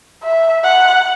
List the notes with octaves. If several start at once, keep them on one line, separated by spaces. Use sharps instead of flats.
E5
F#5